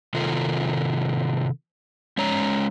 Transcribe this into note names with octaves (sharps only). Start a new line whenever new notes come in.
C3 D#3 F4 A4
G#3 C#4 C#5 A#5